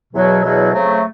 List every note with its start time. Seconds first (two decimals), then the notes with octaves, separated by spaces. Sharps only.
0.13 E2 B2 F#3
0.43 E2 B2 F#3
0.73 F2 C#3 F#3 A3